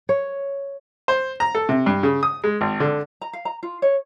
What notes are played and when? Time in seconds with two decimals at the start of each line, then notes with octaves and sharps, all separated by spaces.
0.09 C#5
1.08 C5
1.40 A#5
1.55 A4
1.69 C3
1.86 G2
2.03 C#3
2.23 D#6
2.44 G#3
2.61 G#1
2.80 D3
3.21 A#5
3.33 F5
3.45 A#5
3.63 F4
3.82 C#5